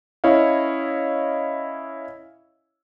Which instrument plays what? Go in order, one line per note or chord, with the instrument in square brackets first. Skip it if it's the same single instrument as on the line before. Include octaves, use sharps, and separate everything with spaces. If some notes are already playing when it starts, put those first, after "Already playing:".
[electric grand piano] C#4 E4 C#5 D#5 F5